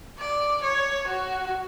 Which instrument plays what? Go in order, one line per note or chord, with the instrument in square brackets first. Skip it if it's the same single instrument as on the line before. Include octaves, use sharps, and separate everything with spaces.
[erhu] D5
C#5
F#4